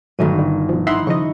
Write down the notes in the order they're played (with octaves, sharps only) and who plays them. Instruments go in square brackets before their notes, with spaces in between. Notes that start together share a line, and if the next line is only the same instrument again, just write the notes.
[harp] G1 D#3 D#7 [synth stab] A#2 F#3 A3
[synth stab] D3
B2 F3
[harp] D#4 E4 F#5 [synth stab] E5 C6
[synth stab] C#3 F3 D#5 [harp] C#6